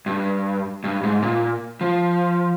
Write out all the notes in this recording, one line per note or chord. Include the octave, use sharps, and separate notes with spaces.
G2
G2
G#2
A#2
F3